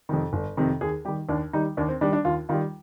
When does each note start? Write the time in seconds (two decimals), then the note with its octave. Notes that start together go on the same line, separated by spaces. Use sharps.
0.09 F2 C3 D#3
0.33 G1
0.57 F2 C3 D#3
0.81 D#2 G#4
1.05 G3 G4
1.08 D#3
1.29 D#2 D4
1.53 D#3 G3 D#4
1.77 D#2 D4
1.88 C4
2.01 D#3 G3 D4
2.13 D4
2.25 D#2 F4
2.49 D#3 G3 F4